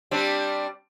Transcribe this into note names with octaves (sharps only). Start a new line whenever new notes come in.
G3 C4 D4